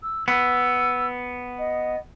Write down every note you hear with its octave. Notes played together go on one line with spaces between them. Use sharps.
E6
B3 E6
D#5